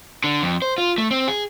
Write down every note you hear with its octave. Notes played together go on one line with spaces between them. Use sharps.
D3
F2
C5
F4
A3
C4
G#4